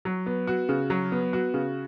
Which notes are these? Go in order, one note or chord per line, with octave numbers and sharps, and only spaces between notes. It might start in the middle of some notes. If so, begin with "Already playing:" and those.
F#3
B3
F#4
C#3
F#3
B3
F#4
C#3